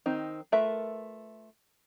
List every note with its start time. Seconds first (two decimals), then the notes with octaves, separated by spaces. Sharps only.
0.06 D#3 C4 D#4
0.52 A3 F4 A#4 B4 E5